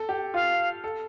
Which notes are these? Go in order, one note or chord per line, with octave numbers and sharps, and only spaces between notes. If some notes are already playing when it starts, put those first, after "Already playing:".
Already playing: A4
G4
F4 F5
A4